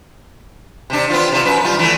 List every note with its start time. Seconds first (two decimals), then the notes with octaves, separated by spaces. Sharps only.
0.90 C3 D4
1.10 B3 C4 F4
1.32 C3 F4
1.45 F#2 B4
1.64 G3 F4
1.79 E3 A3